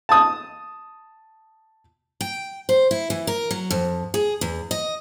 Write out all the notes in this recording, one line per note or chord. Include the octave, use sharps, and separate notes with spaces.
A5 D#6
G5
C5
E4
E3
A#4
F#3
F2
G#4
E2
D#5